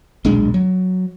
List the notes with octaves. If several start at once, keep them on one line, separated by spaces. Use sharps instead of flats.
D#1 B1 G#3 D4
F#3